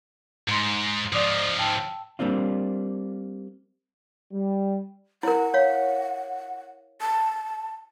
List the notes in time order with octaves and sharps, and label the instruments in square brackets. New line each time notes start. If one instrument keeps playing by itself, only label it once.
[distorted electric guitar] G#2 [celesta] A#5 C6
[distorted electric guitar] G#2 F3 [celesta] D5 D6 D#6
[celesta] G5 A5 E6
[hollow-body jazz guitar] G3 A#3 C4 D4 F4
[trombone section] G3
[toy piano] E4 A#4 [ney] F#5
[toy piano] C#5 F5
[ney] A5